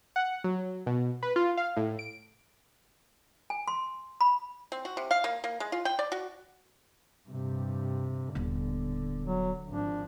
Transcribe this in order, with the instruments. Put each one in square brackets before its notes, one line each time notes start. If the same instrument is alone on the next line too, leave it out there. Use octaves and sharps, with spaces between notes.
[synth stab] F#5
F#3
B2
B4
F4
F5
A2
D7
[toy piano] G#5
C6
B5
[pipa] C4
F#4
C3
F5
A#3
A#3
G#3
F4
G5
D5
F#4
[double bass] G2 C3
[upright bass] D#1 B3 [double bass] D3
[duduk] F#3
[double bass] G#1 F3 [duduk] D4